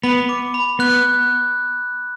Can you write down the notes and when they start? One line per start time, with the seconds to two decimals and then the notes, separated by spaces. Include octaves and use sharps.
0.03 B3 B5
0.29 D6
0.54 B5
0.79 B3 F#6